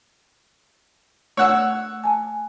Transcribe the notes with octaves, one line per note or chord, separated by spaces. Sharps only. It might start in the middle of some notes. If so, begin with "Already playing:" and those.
A3 C#5 F#5 E6
G#5 A5